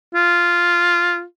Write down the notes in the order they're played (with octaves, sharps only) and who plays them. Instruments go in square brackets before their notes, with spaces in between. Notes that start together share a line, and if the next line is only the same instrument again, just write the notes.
[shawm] F4